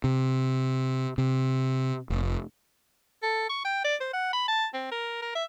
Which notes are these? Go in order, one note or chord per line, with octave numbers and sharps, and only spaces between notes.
C3
C3
F1
A4
C#6
G5
D5
C5
F#5
B5
A5
C4
A#4
A#4
E5